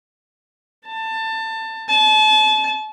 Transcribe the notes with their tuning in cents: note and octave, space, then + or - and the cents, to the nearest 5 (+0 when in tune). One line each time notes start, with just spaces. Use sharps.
A5 +20
A5 -35